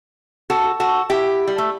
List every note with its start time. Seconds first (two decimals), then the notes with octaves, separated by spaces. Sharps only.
0.50 F#4 A4
0.80 F#4 A4
1.10 E4 G4
1.47 G3
1.58 A3